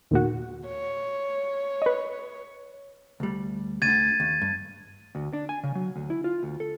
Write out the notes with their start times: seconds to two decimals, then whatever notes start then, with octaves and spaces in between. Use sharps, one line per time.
0.11 D#2 A#2 F#4
0.68 C#5
1.82 B4 D#5
3.20 D2 G3
3.82 D2 D3 G#6 A6 D#7
4.20 D#2
4.41 G2
5.15 D2
5.33 D4
5.49 G#5
5.63 C#3
5.75 F#3
5.96 D2
6.10 E4
6.24 F4
6.43 D2
6.60 A4